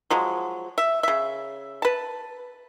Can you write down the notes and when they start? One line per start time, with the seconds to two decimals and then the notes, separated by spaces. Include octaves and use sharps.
0.10 F3 F#3 G#3
0.78 E5
1.03 C#3 E5
1.82 B4 A5